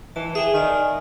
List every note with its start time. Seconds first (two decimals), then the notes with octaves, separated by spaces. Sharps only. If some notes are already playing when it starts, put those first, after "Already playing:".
0.16 E3 A5
0.35 G#4 E5 G5 G#5
0.54 D#3 D5 D#5 G#5